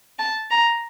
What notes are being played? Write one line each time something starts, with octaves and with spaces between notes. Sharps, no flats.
A5
A#5